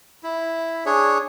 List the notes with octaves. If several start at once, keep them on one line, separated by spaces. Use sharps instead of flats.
E4
D4 G#4 C#5